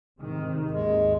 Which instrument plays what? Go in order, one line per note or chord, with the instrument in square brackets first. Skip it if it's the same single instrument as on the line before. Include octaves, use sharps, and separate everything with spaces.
[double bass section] G#2 C3 D#3
[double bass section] G#1 D#2 [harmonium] G#3